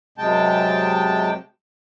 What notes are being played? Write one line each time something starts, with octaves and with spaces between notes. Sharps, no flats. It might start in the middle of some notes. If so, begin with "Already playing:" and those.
F#2 C3 G#3 G5 A5